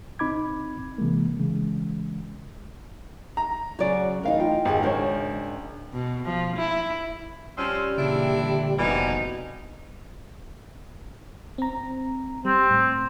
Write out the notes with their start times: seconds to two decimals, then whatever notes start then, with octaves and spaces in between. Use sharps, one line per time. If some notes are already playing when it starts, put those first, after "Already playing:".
0.19 C2 C4 D#4 B5 D6 G#6
0.98 C3 E3 G#3 A#3
1.40 C#3 E3 G#3
3.37 A#5
3.79 C#3 F#3 F#4 C#5 D5
4.23 A2 E3 D#4 A#4 F5
4.40 F4 G5
4.65 G#1 D#4 G4 G#4
4.83 G#2 C#3 D4 A#4 C5 C#5
5.93 B2
6.26 F3
6.57 E4
7.57 F3 G3 C4 C#4
7.97 A#2 C#3 E3 D4 E4
8.34 D3
8.79 F1 F2 B2 E3 G3 D#4
11.58 C4 A#5
12.45 G3 C4
12.70 A2